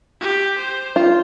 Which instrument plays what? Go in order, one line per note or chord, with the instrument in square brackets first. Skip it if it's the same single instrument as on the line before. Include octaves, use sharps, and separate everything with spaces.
[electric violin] G4
C5
[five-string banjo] F4